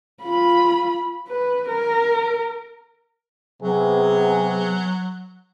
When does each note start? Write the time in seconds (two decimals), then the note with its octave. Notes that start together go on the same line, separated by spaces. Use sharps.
0.23 F4 B5
1.28 B4
1.68 A#4
3.62 C3 F#3 B3 G#4